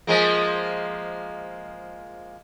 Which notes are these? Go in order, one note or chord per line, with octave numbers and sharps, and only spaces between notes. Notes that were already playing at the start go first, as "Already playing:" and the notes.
F3 G#3 A#3